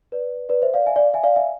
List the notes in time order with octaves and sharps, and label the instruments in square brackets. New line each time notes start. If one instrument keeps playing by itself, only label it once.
[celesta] B4 D5
B4 D5
C5 E5
D5 F5
E5 G#5
D5 F5
E5 G#5
D5 F5
E5 G#5